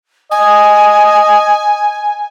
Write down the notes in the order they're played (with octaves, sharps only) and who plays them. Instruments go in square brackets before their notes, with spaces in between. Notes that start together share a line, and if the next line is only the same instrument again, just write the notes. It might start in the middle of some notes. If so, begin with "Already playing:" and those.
[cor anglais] D#5 [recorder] G#5